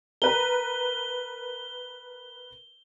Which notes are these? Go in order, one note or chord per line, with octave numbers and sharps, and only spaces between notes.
A#4 B4 A#5 G7